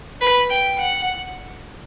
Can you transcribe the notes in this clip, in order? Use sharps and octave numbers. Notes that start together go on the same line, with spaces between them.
B4
G5
F#5